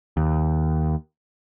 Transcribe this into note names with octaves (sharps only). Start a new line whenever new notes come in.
D#2